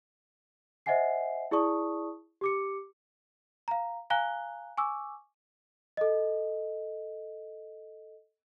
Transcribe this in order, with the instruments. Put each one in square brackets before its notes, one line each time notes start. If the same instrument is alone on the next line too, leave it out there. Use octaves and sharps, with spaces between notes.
[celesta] C5 D#5 E5 F#5 G#5 C7
E4 G#4 D5 A5 C#6 D#6
G4 D6 C#7
F5 A#5
F5 G#5 A#5 F#6 G7
G#5 C#6 D6 E6
A4 D#5